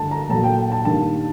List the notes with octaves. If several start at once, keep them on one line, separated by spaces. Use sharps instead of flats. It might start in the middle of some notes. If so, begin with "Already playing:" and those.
Already playing: G2 D3 A3 A5
A#5
A#2 F#3 A3 A5
G5
G5
A5
G2 D#3 G3 A#3 A5